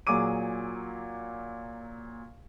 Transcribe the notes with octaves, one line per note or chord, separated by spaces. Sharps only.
A#2 F#3 G#4 D6 D#7